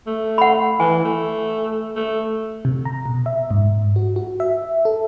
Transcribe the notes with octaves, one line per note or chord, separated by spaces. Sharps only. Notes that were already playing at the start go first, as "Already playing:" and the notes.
A3
F#5 B5
E3 G#5
A3
A3
C3
A#5
B2
E5
G#2
F#4
F#4
E5
A4